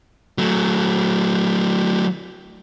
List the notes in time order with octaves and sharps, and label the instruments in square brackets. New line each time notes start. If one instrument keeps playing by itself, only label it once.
[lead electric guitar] F#3 A3